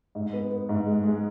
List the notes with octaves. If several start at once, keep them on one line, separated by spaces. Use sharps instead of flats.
G#2
B3
B3
G#2
G#3
G#3